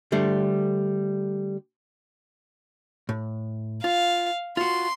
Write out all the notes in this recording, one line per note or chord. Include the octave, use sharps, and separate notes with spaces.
D3 G3 A3 C5
A2
F4 F5
F4 F#4 C6